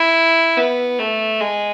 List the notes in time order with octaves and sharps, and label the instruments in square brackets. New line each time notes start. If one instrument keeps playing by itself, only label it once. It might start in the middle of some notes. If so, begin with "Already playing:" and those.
Already playing: [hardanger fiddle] E4
B3
A3
G#3